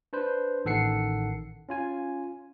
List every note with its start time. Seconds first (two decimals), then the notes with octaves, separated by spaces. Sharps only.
0.13 D4 B4 C5
0.65 A1 D#3 A4 F#5 C7 C#7
1.69 C#4 F4 G#5